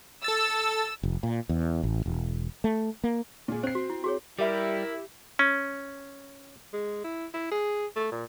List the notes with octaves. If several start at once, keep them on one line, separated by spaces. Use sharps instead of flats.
A4 E6 A6
F1
A#2
E2
A1
E1
A3
A#3
A#2 G#4
C4 C5 C7
F#4
E4
F#4 G#4 C#5
G3 E4 G4 A#4 E5
C#4
G#3
E4
E4
G#4
A3
A#2